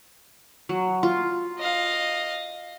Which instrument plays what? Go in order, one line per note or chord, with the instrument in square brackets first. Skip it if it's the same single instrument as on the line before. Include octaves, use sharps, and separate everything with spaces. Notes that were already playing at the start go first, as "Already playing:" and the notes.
[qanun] F#3
F4
[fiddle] D#5 F5